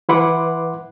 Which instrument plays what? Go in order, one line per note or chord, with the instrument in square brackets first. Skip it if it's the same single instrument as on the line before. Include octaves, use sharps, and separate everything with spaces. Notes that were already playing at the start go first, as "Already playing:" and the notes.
[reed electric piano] E3 E4 B4 F#5 C6 D6